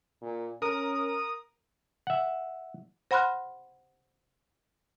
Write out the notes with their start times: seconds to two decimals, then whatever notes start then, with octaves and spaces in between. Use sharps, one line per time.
0.22 A#2
0.62 C#4 A#4 D#6
2.07 E5 F#5
3.11 C5 F#5 B5 C6 F6 F#6